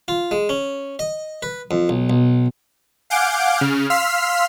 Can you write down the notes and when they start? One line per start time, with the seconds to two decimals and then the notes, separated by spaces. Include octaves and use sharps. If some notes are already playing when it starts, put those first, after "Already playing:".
0.08 F4
0.31 G#3
0.49 C#4
0.99 D#5
1.43 B4
1.71 F2
1.89 B1
2.10 B1
3.10 F5 F#5 G#5 D6 G6 D7
3.60 C#3 F6
3.90 F5 C6 E6 F6 B6